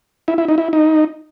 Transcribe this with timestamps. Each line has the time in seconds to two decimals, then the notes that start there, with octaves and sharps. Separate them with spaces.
0.28 E4
0.38 E4
0.48 D#4
0.58 E4
0.73 D#4